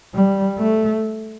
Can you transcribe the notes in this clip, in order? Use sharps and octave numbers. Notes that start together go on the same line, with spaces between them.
G3
A3